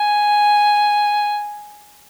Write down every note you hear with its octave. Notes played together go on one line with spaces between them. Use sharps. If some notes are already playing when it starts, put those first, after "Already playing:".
Already playing: G#5